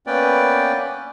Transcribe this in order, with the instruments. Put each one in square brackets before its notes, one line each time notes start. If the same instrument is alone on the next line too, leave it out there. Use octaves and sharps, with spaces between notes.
[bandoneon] A#3 B3 C#4 B4 D5 G5